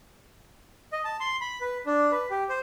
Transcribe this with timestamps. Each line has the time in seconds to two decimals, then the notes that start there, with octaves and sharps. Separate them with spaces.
0.92 D#5
1.05 A5
1.20 C6
1.41 B5
1.61 B4
1.86 D4
2.12 B4
2.31 G4
2.49 C5